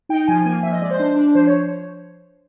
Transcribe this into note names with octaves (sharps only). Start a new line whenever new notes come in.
D#4 G5
F3 G#5
A#3 G#5
F3 E5
D#5
G#3 D5
C5
D4
D4
F3 C5
C#5